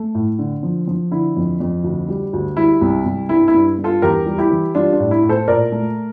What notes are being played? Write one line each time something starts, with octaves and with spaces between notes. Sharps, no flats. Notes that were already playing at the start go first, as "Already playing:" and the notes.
Already playing: A3
A2
D3
F3
F3
D3 E4
F2
F2
D2
G3
D2
G3 E4
C2
C2
G2 E4
E4
G2
G2
F4 A4
E2 G4 A#4
G3
E4 G4
E3
G3 D4 F4
D4
A2
E4
A2
A4 C5
A#2 A#4 D5
A3